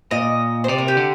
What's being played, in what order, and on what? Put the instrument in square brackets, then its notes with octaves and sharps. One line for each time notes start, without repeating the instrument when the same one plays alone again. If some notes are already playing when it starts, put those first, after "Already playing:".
[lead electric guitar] A#2 [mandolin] D#5
[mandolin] C5
[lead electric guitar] C3 [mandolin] D5
[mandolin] A#4
G4
[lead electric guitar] D3